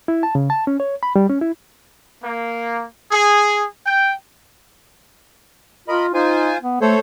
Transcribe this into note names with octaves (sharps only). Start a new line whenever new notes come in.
E4
A5
C#3
A5
C#4
C#5
B5
G3
C#4
E4
A#3
G#4
G5
F4 A#4 D#5 B5
D#4 F4 C5 G#5
B3
A3 A4 C5 C#5